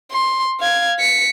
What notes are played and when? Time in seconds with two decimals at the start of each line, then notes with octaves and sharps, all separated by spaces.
0.11 C6
0.60 F5 G#6
1.00 B6 C#7